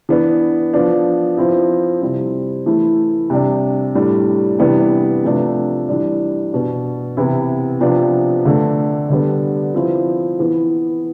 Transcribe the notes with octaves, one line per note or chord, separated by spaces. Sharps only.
E3 B3 D4
F3 B3 D4
F3 C4 E4
C3 G3 C4 E4
E3 A3 E4
C3 G3 D4
A2 G3 D4
C3 E3 G3 B3 D4
C3 F3 A3 D4
E3 G3 D4
B2 B3 D4
C3 E3 B3 E4
C3 F3 B3 D4
D3 A3 D4
D3 G3 B3 D4
F3 C4 E4
E3 B3 E4